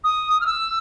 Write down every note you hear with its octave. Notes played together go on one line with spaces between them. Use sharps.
D#6
F6
E6